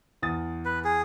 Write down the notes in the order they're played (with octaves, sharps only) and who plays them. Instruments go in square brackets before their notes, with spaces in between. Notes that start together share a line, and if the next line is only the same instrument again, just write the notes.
[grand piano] E2 D#6 A6
[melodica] B4
G#4